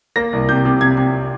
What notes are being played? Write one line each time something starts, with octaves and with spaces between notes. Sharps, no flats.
A#3 A#6
C2
C3 G6
C3
C3 G#6
C3